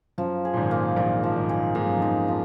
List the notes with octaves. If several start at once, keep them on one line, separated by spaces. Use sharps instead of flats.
F#2 F3
G#4
A#2
G#1 G#2
A#3
A#1 A#2 D#4
F3
G#1 G#2
G#4
G#2 A#3
F#2
F2 D#4
F#2
F3